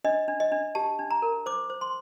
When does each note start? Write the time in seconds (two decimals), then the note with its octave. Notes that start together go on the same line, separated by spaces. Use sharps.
0.04 D4 D#5
0.28 D4
0.40 D#5
0.52 D4
0.75 G4 A5
0.99 D4
1.11 A#5
1.22 A#4
1.46 C5 D6
1.70 C5
1.81 C6